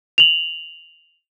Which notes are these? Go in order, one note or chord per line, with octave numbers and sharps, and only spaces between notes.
F7 F#7